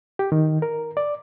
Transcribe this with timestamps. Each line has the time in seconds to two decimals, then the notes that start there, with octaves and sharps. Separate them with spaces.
0.19 G4
0.32 D#3
0.62 A#4
0.97 D5